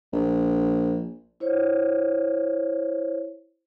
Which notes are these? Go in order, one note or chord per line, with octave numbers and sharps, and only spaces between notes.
A#1
E4 C5 C#5